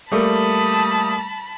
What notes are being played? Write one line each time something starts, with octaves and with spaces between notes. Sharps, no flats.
G3 A3 A#3 A5 B5 D#6